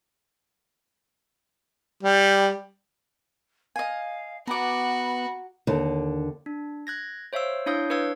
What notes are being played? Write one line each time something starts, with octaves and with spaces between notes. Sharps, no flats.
G3
D#5 F5 G#5
B3 F#4 A#5 B5 D6
D#2 D3
D4
F#6 G#6 A#6
C5 C#5 E5 F5 E6
D4 E4 C#5 F5 D#6 G6
D4 B4 C#5 F5 E6 G#6